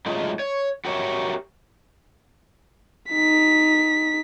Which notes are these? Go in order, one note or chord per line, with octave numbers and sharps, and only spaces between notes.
F#3 G#3 A3 D#4 F4 G#4
C#5
F#4 G4 A#4 C#5 D5 E5
D#4 B6